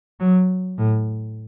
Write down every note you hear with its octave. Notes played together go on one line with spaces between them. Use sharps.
F#3
A2